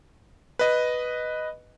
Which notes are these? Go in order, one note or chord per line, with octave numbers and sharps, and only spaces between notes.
B4 D#5